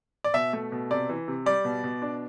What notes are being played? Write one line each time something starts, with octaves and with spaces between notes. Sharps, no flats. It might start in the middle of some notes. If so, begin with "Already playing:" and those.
D5
B2 E5
A3
B2
C3 D5
E3
C3
G3 D5
B2
B2
D4